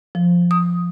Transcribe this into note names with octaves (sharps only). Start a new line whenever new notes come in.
F3
D#6